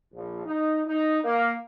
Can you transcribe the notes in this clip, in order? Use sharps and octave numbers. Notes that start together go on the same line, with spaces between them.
A#1
D#4
D#4
A#3